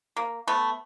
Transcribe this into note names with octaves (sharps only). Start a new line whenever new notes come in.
A#3
A3 B3